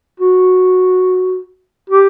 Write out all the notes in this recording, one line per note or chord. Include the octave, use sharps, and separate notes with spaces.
F#4
G4